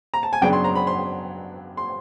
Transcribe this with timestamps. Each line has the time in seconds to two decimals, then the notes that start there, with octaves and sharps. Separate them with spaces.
0.14 A#5
0.23 A5
0.33 G#5
0.41 F#2 C#3 F#3 B3 D4 G5
0.53 C6
0.64 A#5
0.75 B5
0.87 C6
1.77 C6